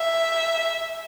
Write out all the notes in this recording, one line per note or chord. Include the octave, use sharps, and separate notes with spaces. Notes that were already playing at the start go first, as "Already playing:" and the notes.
Already playing: E5